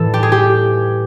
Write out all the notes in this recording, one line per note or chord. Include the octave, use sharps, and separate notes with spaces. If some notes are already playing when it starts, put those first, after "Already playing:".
Already playing: A2 E3 G3 A4
G4
G#4
G4